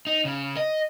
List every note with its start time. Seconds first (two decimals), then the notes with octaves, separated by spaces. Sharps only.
0.07 D#4
0.25 C#3
0.57 D#5